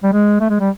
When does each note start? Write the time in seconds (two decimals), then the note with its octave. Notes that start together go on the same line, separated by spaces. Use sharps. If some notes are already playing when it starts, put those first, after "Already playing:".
0.03 G3
0.13 G#3
0.40 A3
0.50 G#3
0.60 G3